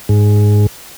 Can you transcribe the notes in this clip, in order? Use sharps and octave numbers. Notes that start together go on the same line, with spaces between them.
G#2